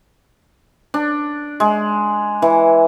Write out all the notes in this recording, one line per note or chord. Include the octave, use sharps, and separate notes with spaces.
D4
G#3
E3